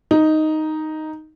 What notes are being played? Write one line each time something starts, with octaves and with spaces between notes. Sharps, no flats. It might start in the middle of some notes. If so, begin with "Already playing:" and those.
D#4